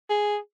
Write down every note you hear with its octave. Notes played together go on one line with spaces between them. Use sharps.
G#4